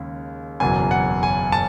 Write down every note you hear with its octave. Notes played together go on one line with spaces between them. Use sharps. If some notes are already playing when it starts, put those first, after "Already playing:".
Already playing: D#2 C#3 G#3
F#1 E2 B2 F#3 G#5
F#5
G#5
A5